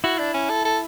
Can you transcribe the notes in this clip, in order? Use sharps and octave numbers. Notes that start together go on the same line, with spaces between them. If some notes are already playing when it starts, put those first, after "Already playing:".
E4 F#4
D4
C#4
A4
A4